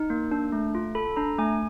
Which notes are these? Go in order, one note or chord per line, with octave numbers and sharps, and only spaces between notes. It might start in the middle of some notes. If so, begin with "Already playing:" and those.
Already playing: D#4
A#3
D4
A3
F4
A4 B5
D4 A#5
A3 G#5